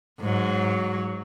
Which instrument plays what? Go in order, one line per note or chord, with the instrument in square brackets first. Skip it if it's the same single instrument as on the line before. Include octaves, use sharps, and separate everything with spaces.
[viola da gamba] G#2 F#3